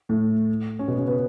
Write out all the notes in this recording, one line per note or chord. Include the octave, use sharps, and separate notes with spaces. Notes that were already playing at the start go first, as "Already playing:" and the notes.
A2 A3
C#4
B2 B3
C#3 C#4
B3 B4